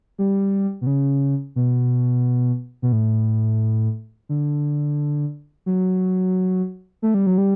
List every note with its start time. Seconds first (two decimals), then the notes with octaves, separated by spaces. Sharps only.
0.19 G3
0.81 B2
0.87 C#3
1.56 B2
2.82 B2
2.92 A2
4.29 D3
5.66 F#3
7.02 A3
7.14 G3
7.26 F#3
7.38 G3